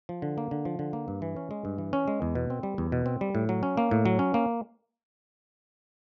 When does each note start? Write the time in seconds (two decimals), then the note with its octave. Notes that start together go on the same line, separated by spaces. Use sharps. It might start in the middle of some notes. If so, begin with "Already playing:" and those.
0.09 F3
0.22 D3
0.38 A#3
0.51 D3
0.65 F3
0.79 D3
0.93 A#3
1.08 G2
1.22 E3
1.37 C#4
1.51 G#3
1.65 G2
1.78 E3
1.93 C#4
2.08 G#3
2.22 E2
2.35 B2
2.50 C4
2.63 G3
2.78 E2
2.92 B2
3.06 C4
3.21 G3
3.35 A2
3.49 F#3
3.63 C#4
3.77 A#3
3.91 A2
4.05 F#3
4.19 C#4
4.34 A#3